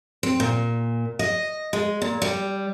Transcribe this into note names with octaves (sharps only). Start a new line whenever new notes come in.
C4
A#2
D#5
G#3
A#2
G3